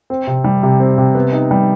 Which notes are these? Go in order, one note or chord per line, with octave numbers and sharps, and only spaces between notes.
C4
C3
G3
C3
C4
C3
B3
D#4
G3